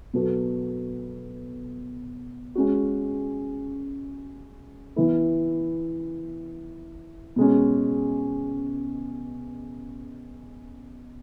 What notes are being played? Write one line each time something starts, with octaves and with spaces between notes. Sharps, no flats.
B2 F#3 B3 F#4 A4
G#3 C#4 F#4
E3 B3 E4
B2 G#3 C#4